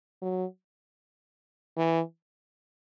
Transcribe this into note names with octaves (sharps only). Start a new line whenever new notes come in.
F#3
E3